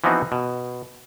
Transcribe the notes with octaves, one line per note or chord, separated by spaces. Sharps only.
E3 F3 B3 C4 D#4 F#4
B2